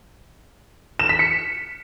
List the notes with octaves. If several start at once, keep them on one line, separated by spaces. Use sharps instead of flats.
E7
B6
C#7